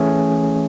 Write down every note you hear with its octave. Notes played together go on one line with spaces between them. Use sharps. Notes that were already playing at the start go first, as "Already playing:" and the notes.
Already playing: E3 A3 C#4 G#4